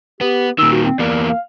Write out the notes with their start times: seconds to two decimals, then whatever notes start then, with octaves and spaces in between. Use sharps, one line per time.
0.21 B3 G4
0.58 A#2 D#3 E6
0.72 F#4
0.84 C4
0.99 E2 A#3 D5
1.28 F5